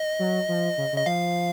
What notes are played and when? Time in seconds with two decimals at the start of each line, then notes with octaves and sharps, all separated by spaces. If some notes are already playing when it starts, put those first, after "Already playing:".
Already playing: D#5
0.19 F#3
0.48 F3
0.78 C#3
0.93 C#3
0.98 D#5
1.06 F3 F5